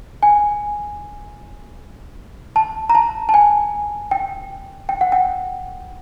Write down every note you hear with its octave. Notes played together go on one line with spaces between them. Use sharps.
G#5
A5
A#5
A5
A5
G#5
G5
G5
F#5
G5